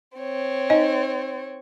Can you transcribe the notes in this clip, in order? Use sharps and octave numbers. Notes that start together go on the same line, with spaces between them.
C4 C#5
D#4 D#5 G#5